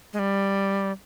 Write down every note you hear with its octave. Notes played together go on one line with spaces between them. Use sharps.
G#3
G3